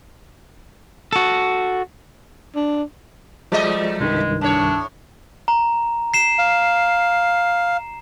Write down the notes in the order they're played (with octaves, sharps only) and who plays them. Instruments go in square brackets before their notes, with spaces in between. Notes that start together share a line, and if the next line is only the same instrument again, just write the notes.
[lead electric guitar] F#4 A4
[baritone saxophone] D4
[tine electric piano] F3 G#3 D5 [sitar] F#3 A3 D#5
[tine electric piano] C2 G2 D#3 [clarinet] G#3
[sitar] A2 C#5 [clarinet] D4
[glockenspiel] A#5
C7 E7
[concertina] F5